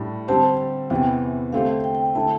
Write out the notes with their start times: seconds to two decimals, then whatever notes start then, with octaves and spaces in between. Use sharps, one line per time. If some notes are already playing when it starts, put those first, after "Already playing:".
Already playing: A2 G3 D4
0.28 D3 G3 C4 G4 C5 A5
0.90 E2 C3 E3 G5
1.52 D3 A3 C4 G4 C5 F5
1.84 G5
1.95 G5
2.05 G5
2.15 D3 A3 E4 A5